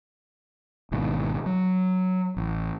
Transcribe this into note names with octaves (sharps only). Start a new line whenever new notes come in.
G#1 G#2 B2 D#3
F#3
A1